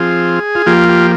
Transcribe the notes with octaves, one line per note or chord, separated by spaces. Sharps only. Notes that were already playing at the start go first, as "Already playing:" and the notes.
Already playing: F3 C4 F4 G#4
F4
F3 A#3 F4 G4
G4